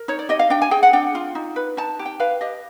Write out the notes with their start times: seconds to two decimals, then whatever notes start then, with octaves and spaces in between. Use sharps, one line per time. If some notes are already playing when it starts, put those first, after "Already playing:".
Already playing: A#4
0.08 D#4 C#5
0.19 D5
0.29 G4 D#5
0.39 F5
0.50 D4 G5
0.62 G#5
0.71 G#4 G5
0.83 F#5
0.93 D4 G5
1.15 F4
1.35 D#4
1.56 B4
1.77 D#4 A5
1.99 G4
2.05 G5
2.20 B4 F5
2.41 G4 D#5